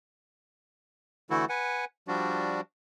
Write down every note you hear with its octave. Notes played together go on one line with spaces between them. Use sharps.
D3 E3 A3 E4 F#4 A4
B4 F#5 G#5
F3 G3 D4 F#4